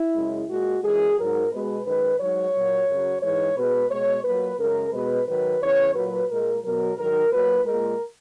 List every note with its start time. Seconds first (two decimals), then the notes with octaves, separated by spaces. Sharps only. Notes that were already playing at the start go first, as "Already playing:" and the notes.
Already playing: E4
0.15 F#2 C#3 G#3
0.49 A#2 G#3 F#4
0.83 F#2 E3 G#3 G#4
1.18 G#2 F#3 A#4
1.52 B2 G#3 B4
1.85 F#2 D#3 G#3 B4
2.19 G#2 F#3 C#5
2.54 A#2 F#3
2.88 F#2 C#3 F#3
3.21 G#2 E3 G#3 C#5
3.56 B2 G#3 B4
3.91 B2 G#3 C#5
4.24 A#2 F#3 B4
4.59 F#2 C#3 G#3 A#4
4.92 B2 G#3 B4
5.26 G#2 D#3 F#3 B4
5.61 E2 C#3 E3 C#5
5.94 A#2 F#3 B4
6.29 A#2 G#3 A#4
6.63 B2 F#3 A#4
6.97 G#2 D#3 F#3 A#4
7.32 A#2 F#3 B4
7.65 A#2 G#3 A#4